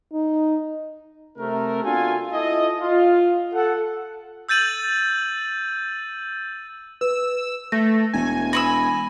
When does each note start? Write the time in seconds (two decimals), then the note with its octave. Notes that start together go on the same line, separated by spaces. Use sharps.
0.13 D#4
1.38 C3 A3 A#4
1.83 B3 D4 F4 F#4 A4 G#5
2.33 E4 F4 A4 D#5
2.79 F4
3.53 A4 F#5
4.49 E6 G6 A6 D#7 F#7
7.01 B4 E6
7.72 A3 A#6
8.13 E1 G#5
8.53 B5 C#6 E6 A#6